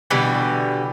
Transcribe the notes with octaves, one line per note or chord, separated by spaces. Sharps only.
B2 D3 E3 G3